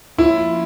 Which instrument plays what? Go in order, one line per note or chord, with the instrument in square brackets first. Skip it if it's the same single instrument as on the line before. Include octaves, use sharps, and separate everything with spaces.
[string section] F3 A#3 C#4 F4 [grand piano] E4